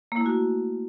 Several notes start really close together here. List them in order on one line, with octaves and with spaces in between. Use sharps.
A#3 E4 A3 F#4